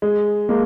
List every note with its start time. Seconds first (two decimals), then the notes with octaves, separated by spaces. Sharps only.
0.02 G#3
0.49 G#3 A#3